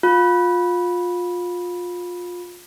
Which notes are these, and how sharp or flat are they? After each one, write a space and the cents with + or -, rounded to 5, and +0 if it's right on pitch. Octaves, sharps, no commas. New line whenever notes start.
F4 +25